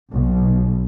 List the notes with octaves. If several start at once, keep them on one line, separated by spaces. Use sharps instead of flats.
B1